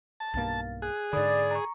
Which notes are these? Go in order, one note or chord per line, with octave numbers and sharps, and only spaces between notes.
A5
B1 G2 A#3 F5 A6
G#4 F#6
G#2 D3 D5 B5 D#6
A#5 C#6